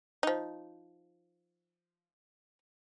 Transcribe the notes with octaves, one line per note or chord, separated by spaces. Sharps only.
F3 D#4